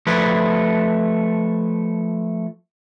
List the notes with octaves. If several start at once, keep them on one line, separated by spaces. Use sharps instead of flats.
F3 A3 B4